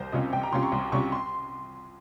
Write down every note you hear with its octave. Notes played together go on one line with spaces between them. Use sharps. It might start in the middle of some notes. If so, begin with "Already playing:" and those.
Already playing: C2 G3 A#4 C5
C3 G3 C#4 F4 D#5
C2 G5
A#5
C3 G3 C#4 F4 C6
C#6
C2
C3 G3 C#4 F4 C#6
C6